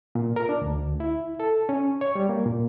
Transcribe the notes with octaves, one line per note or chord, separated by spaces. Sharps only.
A#2
A#4
D4
D2
E4
A4
C#4
C#5
G3
A#3
A#2